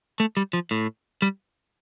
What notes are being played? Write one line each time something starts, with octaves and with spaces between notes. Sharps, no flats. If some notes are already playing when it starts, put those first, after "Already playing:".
A3
G3
F3
A2
G3